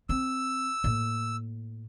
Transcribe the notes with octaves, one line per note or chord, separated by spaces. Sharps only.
C4 E6
A2 A#3